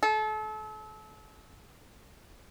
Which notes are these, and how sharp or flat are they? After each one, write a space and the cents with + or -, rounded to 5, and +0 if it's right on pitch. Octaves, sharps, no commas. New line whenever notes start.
A4 -35